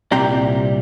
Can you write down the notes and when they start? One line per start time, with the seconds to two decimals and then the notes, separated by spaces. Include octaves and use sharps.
0.12 C2 A#2 G3 C4 G5 A#5